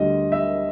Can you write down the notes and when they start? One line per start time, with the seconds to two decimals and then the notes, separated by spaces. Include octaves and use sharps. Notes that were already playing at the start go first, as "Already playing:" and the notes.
Already playing: D2 D3 G3 D#5
0.32 E5